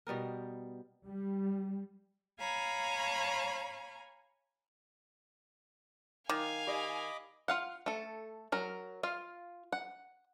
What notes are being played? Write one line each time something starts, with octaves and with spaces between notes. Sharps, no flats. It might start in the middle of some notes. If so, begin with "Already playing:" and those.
B2 G3 B3 A#4
G3
C#5 F5 G#5 A#5 B5
D#3 F5 G#5 D6
G4 D5 D#5 B5 D6
F4 F5 F#5
A3 A4
F#3 A#4
F4 F5
F#5